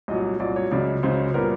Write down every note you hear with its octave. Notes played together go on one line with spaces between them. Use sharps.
C2 A#2 F#3 D#5
C2 A#2 F#3 D5
C#5
C#2 C#3 F#3 D5
C#2 C#3 F#3 C5
A#2 G3 B3 A#4